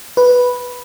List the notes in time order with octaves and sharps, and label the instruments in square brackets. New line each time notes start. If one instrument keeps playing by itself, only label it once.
[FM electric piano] B4